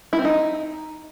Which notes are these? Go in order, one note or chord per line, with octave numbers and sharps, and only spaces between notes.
E4
C4
D#4